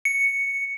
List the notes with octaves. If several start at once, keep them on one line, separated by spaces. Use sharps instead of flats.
C#7